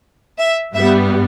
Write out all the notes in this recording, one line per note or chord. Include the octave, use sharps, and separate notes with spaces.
E5
G2 G3 B3 E5